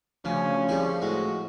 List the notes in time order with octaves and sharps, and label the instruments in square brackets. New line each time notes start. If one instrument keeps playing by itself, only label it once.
[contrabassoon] D2 [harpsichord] C#3 [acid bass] F3 [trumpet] C#4
[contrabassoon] C2 [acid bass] F3 [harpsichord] G3 G#4
[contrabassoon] A2 [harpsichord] G#3 [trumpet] F#4